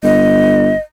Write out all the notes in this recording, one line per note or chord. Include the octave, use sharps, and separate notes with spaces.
G1 D#5